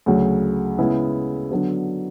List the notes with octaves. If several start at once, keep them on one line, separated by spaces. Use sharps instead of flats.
D2 C#3 F#3
C#3 G#3 B3 E4
D3 F#3 B3 D4 F#4